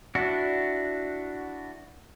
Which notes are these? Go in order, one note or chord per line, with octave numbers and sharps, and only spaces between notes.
D4 E4 F#4